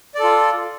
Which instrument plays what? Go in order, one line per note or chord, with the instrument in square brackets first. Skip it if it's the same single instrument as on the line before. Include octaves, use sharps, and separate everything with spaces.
[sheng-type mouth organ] D5
A4
F4